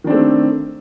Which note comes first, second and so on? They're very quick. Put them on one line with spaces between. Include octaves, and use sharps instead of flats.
D#3 D4 C4 A3